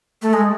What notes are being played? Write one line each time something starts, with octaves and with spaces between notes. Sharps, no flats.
A3
G#3